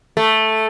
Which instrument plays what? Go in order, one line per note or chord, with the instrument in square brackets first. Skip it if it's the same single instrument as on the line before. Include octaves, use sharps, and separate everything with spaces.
[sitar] A3